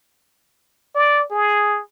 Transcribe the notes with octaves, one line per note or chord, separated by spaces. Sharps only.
D5
G#4